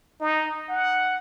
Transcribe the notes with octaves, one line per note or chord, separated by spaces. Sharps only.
D#4
F#5